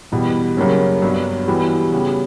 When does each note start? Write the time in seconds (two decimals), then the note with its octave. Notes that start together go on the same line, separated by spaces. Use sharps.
0.12 E2 B2 G3
0.57 F#2 C#3 G3 A#3 C#4
1.02 G2 F#3 B3 D4
1.48 E3 G3 B3 F#4
1.92 C#3 G3 B3